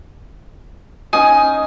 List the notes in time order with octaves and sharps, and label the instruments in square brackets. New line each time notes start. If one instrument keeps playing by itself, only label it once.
[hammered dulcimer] C#4 D#4 [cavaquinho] G#5 D#6